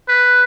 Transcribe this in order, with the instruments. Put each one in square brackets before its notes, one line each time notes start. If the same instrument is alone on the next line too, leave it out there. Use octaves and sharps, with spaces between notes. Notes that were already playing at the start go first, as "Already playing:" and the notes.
[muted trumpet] B4